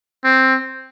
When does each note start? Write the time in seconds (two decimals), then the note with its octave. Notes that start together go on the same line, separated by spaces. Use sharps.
0.24 C4